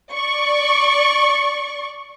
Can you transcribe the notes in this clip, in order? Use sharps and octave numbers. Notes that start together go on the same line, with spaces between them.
D5 C#6